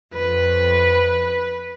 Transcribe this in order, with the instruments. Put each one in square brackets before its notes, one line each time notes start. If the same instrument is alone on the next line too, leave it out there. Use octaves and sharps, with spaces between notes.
[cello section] F2 [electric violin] B4